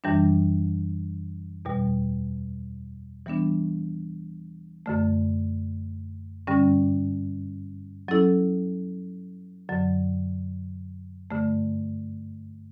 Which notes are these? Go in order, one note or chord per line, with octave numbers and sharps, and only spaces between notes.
F#2 E3 G3 D4
E2 B2 G3
E3 G3 B3 D4
F#2 D3 A3
G2 D3 G3 C#4
F#3 C#4 E4 A4
F#2 D3 F#3
G2 D3 A3